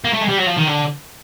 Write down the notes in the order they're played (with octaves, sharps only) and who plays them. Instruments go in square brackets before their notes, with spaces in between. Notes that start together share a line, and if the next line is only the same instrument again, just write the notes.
[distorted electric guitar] A#3
A3
G#3
G3
F#3
F3
D#3
D3